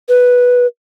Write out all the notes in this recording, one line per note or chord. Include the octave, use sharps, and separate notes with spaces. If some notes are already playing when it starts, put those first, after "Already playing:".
B4